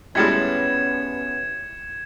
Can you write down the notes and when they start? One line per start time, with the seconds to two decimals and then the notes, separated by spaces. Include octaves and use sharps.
0.15 A2 G3 G#3 B3 C#4 G#6 C#7 E7